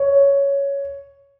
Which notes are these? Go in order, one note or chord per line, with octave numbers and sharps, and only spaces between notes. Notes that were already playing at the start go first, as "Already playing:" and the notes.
Already playing: C#5